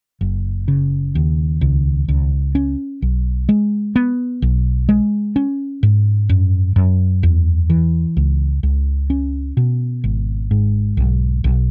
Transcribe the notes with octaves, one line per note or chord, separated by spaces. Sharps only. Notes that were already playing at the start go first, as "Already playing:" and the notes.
F#1
C#3
D#2
C#2
C#2
C#4
B1
G#3
B3
B1
G#3
C#4
G#2
F#2
F#2
E2
E3
C#2
C#2
C#4
B2
G#1
G#2
B1
B1